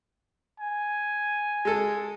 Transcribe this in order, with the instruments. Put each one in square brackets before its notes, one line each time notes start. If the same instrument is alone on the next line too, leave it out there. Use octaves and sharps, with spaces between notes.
[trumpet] G#5
[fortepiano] G#3 A4